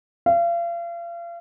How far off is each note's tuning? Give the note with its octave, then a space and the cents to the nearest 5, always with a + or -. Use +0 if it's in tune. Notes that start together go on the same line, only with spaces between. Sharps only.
F5 -35